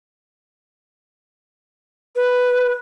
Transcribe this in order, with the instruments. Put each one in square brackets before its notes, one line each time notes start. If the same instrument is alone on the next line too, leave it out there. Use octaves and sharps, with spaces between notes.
[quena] B4